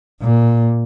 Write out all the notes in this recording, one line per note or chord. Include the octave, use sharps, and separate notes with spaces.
A#2